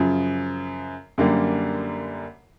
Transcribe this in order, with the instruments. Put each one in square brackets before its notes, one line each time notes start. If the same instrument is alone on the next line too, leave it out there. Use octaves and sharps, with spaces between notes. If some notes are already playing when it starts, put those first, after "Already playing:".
Already playing: [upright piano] F#2 C#3 F3
F#2 D3 G3 A#3